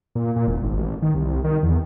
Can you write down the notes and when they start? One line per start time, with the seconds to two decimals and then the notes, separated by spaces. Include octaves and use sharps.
0.15 A#2
0.36 A#2
0.47 E1
0.63 G#1
0.77 A1
1.02 D#3
1.15 C2
1.44 D#3
1.63 E2